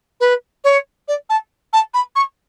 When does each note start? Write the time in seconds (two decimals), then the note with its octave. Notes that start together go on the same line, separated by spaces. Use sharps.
0.20 B4
0.64 C#5
1.07 D5
1.29 A5
1.73 A5
1.93 B5
2.15 C#6